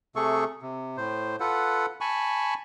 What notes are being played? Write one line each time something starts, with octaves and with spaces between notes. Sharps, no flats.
C3 A3 G#4 A4 C#6
C3
A2 C5
F4 A4 B4 F#5
G#5 A5 B5 C#6